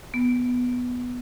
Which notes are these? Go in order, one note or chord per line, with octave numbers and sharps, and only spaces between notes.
B3